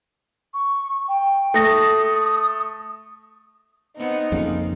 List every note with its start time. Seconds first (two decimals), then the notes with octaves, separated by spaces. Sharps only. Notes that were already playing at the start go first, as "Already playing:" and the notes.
0.54 C#6
1.08 G5
1.54 A3 D#6 A#6
3.97 B3 C4 D#4
4.32 F2 C#3 A#3